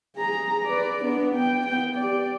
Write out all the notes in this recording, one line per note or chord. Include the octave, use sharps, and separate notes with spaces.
G#4 A#5
B4 D5
B3 D4
G5
B3 G5
G4 D5